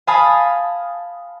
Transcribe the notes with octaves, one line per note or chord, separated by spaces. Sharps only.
F5 G#5 A5 B5 D#6